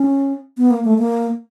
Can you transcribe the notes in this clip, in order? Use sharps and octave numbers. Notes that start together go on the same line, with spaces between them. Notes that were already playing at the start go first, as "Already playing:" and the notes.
Already playing: C#4
B3
A#3
A3
A#3